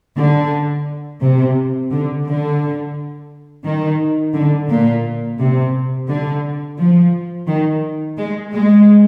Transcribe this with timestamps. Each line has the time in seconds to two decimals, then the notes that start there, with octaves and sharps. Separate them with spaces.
0.16 D3
1.21 C3
1.91 D3
2.26 D3
3.64 D#3
4.34 D3
4.69 A#2
5.39 C3
6.08 D3
6.78 F3
7.47 D#3
8.18 G#3
8.52 G#3